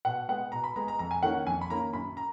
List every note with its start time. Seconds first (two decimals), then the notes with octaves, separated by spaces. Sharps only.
0.05 B2 F#5
0.28 G#3 B3 F#5
0.52 B2 A#5
0.64 B5
0.76 G#3 B3 A#5
0.88 A#5
0.99 F2 A#5
1.11 G#5
1.23 D#3 A#3 C#4 F#5
1.47 F2 G#5
1.61 B5
1.70 D#3 A#3 C#4 A#5
1.93 F#2 B5
2.17 A#5